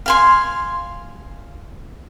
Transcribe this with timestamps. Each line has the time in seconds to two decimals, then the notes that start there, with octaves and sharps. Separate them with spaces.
0.06 F5 G#5 C6